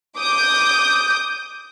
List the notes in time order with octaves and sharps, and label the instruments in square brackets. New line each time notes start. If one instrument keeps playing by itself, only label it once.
[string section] D6 D#6 G6